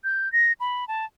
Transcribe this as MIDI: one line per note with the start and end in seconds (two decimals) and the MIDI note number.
0.04 0.31 91
0.33 0.52 94
0.60 0.87 83
0.88 1.05 81